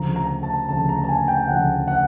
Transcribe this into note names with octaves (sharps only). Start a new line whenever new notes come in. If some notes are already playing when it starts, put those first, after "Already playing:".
Already playing: D2 C#3 F3 A#5
A#5
A5
D2 C#3 F3 A5
A#5
A5
G#5
G5
D2 C#3 F3 F#5
F#5